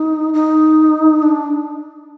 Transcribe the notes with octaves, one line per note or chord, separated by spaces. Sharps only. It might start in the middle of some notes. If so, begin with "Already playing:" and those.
Already playing: D#4
D#4
D4